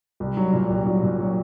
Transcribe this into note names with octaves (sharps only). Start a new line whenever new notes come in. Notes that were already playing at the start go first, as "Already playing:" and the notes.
C2
F#3
A#2
C2
F#3
A#2
F#3